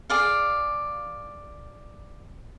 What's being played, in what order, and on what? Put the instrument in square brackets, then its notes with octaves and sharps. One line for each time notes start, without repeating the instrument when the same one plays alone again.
[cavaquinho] G#4 D5 F5